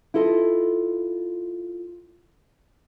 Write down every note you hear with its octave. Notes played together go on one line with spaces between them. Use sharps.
E4 F4 A4 D#5